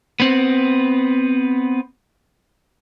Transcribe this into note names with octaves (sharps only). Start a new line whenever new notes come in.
B3 C4